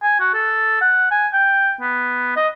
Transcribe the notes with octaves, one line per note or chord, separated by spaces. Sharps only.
G#5
F#4
A4
F#5
G#5
G5
B3
D#5